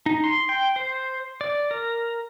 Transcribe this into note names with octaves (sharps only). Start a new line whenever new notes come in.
D#4
C6
G5
C5
D5
A#4